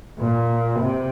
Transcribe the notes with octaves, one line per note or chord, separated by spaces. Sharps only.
A#2
C3